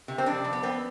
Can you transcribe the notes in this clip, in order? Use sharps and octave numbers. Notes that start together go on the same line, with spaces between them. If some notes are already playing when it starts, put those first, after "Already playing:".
C3
C4
F2 D4
F2
B3
B3 C4